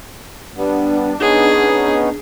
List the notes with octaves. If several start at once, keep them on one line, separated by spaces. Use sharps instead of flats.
G3 B3 D4
B3 C#4 D#4 G#4